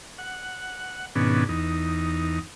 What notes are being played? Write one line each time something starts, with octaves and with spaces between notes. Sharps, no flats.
F#5
G#2 B2 D#3 B3 C#4 D4
E2 D#4